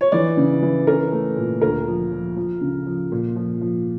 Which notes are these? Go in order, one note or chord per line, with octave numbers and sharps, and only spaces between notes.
C#5
E3 D5
C#3
E3
C#4 A#4
A3
A#2
D2 A#4
F3
F3
F3
C#3
F3
A#2
F3
F3